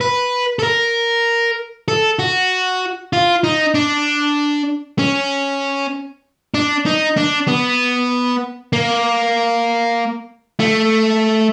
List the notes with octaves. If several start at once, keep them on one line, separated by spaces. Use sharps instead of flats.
B4
A4
A#4
A4
F#4
F4
D#4
D4
C#4
D4
D#4
D4
B3
A#3
A3